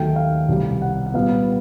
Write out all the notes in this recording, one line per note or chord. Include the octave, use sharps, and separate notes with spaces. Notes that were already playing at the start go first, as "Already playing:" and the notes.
Already playing: D#2 D#3 F#3 A3 G5
F5
C2 B2 G3
F#5
F#5
A#2 G3 B3 F5